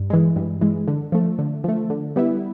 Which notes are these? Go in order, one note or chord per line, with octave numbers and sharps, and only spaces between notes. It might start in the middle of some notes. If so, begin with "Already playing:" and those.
Already playing: G2
E3 G#3
G2
E3 G#3
D3
F3 A3
D3
F3 A3
D3
G3 B3 E4